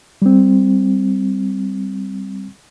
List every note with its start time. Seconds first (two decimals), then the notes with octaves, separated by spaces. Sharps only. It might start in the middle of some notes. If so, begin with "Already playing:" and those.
0.22 G3 C4